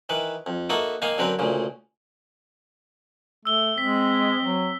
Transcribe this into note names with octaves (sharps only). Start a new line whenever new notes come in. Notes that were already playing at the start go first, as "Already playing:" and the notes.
D#3 E3 B4
F2
A#3 D#4 F#4 A4 B4 E5
D#3 A#3 D#4 F5 G#5
F#2 D3 C4 A#4 B4
D2 A#2 C#3
A3 E6 G7
G#3 C4 B6
F#3